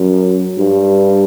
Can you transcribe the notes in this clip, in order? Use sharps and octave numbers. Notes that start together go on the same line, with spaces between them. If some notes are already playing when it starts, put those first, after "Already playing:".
Already playing: F#2
G2